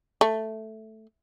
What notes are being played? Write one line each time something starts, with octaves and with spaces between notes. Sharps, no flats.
A3